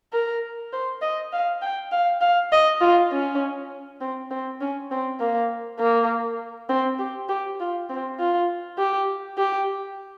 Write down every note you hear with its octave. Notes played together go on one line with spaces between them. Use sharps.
A#4
C5
D#5
F5
G5
F5
F5
D#5
F4
C#4
C4
C4
C#4
C4
A#3
A#3
C4
G4
G4
F4
C4
F4
G4
G4